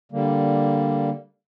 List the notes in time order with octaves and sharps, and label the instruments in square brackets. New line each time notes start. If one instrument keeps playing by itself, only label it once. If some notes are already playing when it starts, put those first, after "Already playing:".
[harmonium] D3 G3 A#3